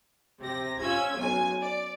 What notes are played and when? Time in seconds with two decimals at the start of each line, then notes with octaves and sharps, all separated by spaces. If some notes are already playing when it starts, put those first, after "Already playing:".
0.40 C3 G4 A#6
0.80 C#4 F4 E6 G#6
1.16 B1 C#4 G#5
1.62 D5